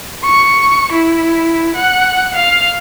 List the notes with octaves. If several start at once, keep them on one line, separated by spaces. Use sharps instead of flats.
C#6
E4
F#5
F5